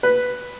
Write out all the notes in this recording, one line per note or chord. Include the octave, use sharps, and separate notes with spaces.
B4